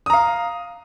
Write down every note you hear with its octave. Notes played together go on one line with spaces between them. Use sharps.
F5 A#5 D#6